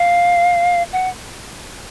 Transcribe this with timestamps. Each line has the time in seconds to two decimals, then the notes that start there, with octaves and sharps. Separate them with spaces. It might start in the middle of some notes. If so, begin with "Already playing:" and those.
Already playing: F5
0.93 F#5